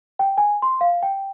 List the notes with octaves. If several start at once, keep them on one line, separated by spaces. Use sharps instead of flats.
G5
G#5
C6
F5
G5